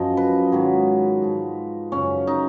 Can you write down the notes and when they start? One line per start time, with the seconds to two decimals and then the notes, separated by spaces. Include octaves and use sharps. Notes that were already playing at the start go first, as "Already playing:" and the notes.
Already playing: F#2 F3 D#5
0.17 B4
0.52 G#2 D#3 F#3
1.22 G#2 F3
1.92 F#2 C#3 F3 C#4
2.27 D#4